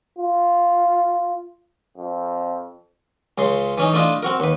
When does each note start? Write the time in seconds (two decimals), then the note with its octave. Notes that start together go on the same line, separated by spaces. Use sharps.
0.19 F4
1.97 F2
3.38 C#2 C#3 C6
3.78 E3 C#4 D#4
3.94 A3 D4 E4 F4 D#5
4.23 C4 F#4 A#4
4.40 D#2 B4